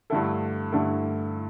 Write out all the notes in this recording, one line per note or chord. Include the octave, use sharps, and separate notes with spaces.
G2 D3 A3 E4 A4
G2 D3 A3 E4 A4